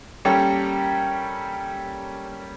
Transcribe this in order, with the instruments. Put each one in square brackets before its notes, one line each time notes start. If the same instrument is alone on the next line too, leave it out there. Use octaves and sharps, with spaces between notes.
[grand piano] G3 A#3 C#4 G4 A4